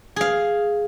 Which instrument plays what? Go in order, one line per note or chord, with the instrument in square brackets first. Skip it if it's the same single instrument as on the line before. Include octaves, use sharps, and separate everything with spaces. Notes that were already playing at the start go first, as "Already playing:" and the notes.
[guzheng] G#4 F5